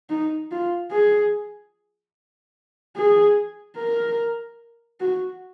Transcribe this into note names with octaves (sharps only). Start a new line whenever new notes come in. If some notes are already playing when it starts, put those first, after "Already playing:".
D#4
F4
G#4
G#4
A#4
F#4